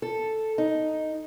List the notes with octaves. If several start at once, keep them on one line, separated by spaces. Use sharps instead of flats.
A4
D#4